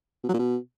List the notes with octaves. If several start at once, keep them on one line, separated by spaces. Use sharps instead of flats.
B2
F#3
A#2
B2